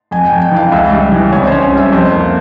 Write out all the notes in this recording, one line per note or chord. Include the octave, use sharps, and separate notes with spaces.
F2 G#5
G5
F2
G5
E3
F5
C#2 E5
G3
E3
C2 C#5
C5
C#4
C#5
G3 E5
F2 C5
A#3